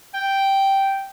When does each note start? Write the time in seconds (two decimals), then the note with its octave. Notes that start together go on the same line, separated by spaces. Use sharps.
0.14 G5